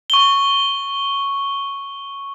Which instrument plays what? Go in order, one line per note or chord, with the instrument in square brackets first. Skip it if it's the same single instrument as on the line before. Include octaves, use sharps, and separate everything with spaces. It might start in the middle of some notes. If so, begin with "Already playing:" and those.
[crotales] C#6 G7